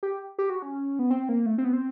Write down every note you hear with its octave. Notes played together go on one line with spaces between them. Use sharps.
G4
G4
F#4
C#4
B3
C4
A#3
A3
C4
B3
C4